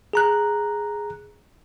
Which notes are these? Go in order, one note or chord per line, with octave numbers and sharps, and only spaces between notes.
G#4 A#5 F#6